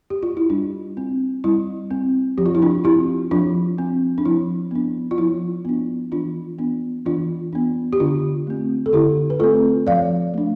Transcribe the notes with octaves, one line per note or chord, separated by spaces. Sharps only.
G4
F4
E4
G3 D4
C4
G3 E4
C4
F3 G4
F4
E4
D4 F4
C4 E4 G4
F3 D4 F4
C4
D4
F3 E4
B3 D4
F4
F3 E4
B3 D4
E3 D4 F4
B3 D4
E3 D4 F4
B3 D4
G4
D3 D4 F4
A3 C4
A4
D3 E4 G4
B4
A3 C4 F4 A4
F3 D5 F5
A3 D4